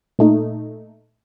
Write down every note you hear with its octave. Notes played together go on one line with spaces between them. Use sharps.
A#2 A3 D#4